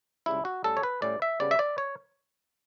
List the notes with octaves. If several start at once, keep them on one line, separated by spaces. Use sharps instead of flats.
C#2 C#3 G3 E4
F#4
A2 G3 C#4 A4
C#5
B4
A2 G3 C#4 D5
E5
C#3 G3 B3 D5
E5
D5
C#5